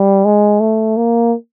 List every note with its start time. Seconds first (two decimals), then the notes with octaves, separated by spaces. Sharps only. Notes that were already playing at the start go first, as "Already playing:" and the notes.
Already playing: G3
0.25 G#3
0.61 A3
0.97 A#3